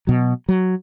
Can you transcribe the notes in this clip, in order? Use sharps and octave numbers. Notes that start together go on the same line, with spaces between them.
B2 F#3
F#3